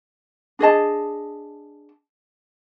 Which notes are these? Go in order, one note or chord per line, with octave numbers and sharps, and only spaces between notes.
D4 G#4 D#5 A5